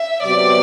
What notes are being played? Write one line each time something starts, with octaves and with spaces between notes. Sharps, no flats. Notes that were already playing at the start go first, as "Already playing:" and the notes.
Already playing: E5
C3 F#3 B3 F#4 D5